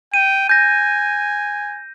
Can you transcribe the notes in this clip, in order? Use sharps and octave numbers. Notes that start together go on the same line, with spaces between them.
G5 D#7
G#5 G6 A#6